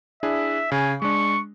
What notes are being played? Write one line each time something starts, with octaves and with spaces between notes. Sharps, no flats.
D4 E4 G#4 E5
C#3 G#5
G#3 D4 C#6